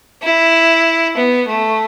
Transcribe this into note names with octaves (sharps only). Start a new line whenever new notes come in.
E4
B3
A3